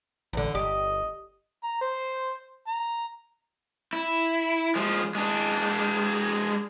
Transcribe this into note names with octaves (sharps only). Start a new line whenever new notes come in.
A1 E2 D3
G1 G4 D#5
A#5
C5
A#5
E4
F3 G#3
G#3 D4